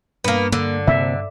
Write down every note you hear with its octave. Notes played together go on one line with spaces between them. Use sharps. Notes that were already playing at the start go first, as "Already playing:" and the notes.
G2 A#3 B3
D3 A#3
C3 A#3 E5